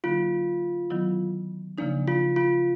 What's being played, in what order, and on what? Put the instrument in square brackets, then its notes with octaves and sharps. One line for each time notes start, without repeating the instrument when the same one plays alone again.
[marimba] D3 F#3 A#3 D#4 [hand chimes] F4
[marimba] D#3 F#3 B3 E4
[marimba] C#3 F3 A#3 D#4 [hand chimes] D4
[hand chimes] F4
F4